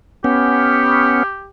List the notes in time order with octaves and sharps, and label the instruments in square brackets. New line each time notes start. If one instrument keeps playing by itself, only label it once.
[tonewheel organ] B3 C#4 [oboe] G4